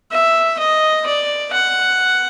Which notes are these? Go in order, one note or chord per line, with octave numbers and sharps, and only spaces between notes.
E5
D#5
D5
F#5